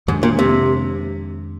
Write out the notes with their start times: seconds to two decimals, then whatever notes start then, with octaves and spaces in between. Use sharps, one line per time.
0.08 F2 G#2 D#3 G#3 D4
0.23 A#2
0.39 C3